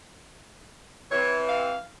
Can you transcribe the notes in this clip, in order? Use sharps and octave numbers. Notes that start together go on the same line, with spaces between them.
C3 E3 C#5
F5